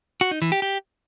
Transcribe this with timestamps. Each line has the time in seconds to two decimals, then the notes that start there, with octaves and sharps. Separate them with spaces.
0.21 F#4
0.31 D#4
0.42 E3
0.52 G4
0.62 G4